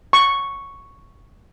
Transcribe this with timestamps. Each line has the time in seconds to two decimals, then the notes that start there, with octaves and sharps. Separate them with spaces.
0.13 C#6